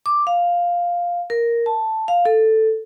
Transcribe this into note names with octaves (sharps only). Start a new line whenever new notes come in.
D6
F5
A#4
A5
F5
A4